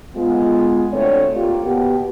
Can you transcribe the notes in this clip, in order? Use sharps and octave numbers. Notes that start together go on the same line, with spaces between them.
G#3 B3 F4
D2 D3 A3 C4 C#5
A#3 F4 G4
B2 B3 G4